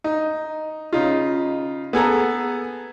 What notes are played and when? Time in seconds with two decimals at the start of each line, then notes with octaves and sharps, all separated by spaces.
0.04 D#4
0.93 C#3 D#4 F4
1.93 B3 G#4 A4 A#5